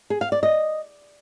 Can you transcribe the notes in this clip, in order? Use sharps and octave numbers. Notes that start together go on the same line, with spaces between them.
G#4
F5
D5
D#5